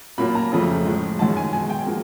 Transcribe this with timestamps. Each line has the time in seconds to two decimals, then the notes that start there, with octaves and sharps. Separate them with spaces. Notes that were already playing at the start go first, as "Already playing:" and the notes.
0.18 A#2 F#3 A#3 B5
0.35 A#5
0.52 F2 C#3 F3 A3
0.85 A2 F3 G#3
1.19 F#2 D#3 G#3 A5
1.37 G#5
1.53 B2 G#3 G#5
1.70 G5
1.87 F3 A#3